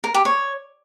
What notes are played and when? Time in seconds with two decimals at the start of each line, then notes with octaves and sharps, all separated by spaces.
0.04 A#4
0.14 G4
0.25 C#5